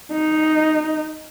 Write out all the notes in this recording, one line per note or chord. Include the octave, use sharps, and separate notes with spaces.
D#4